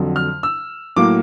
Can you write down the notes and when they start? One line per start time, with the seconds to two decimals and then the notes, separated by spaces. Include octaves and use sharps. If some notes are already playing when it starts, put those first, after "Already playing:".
Already playing: F2 D3 F#3
0.16 F6
0.43 E6
0.96 A2 F#3 A#3 D6